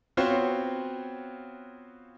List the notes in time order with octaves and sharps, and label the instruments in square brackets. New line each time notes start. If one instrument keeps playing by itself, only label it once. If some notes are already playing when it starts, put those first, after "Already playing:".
[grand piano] B3 C4 F4 F#4 C5 C#5